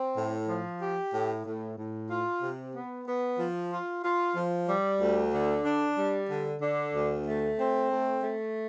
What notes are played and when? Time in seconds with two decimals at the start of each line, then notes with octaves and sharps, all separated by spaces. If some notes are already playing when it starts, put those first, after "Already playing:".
Already playing: C4
0.17 A2
0.48 F3
0.81 G4
1.14 A2
1.46 A2
1.78 A2
2.10 F4
2.42 C3
2.75 B3
3.07 B3
3.38 F3
3.72 F4
4.04 F4
4.36 F3
4.68 G3
5.01 D2
5.32 D3
5.64 D4
5.97 G3
6.30 D3
6.62 D3
6.95 D2
7.27 A3
7.58 C4
7.91 A3
8.23 A3